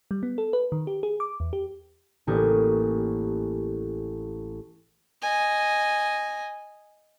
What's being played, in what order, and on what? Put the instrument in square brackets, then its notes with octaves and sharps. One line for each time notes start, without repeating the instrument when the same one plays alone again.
[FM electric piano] G3
B3
A4
B4
D#3
G4
G#4
D6
E2
G4
[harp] A1 A#3 G4 C#5 D#6
[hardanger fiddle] D#5 G#5